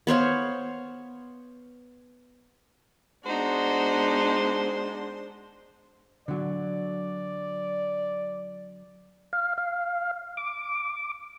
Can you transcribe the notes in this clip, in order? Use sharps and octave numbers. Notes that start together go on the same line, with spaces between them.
B3 C5 C#5 F5
G#3 B3 D4 D#4 F#4 C5
D3 F#3 D5
F5
F5
D6